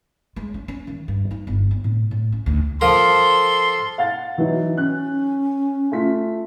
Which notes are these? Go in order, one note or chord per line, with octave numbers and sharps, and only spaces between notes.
G#3
C#4
C#4
D#3
G2
D#4
G1
C4
A2
A2
C#4
D2
F3 A4 A#4 C6
F5 F#5 A6
E3 F#3 D#4
C#4 F#6
A3 F4 B6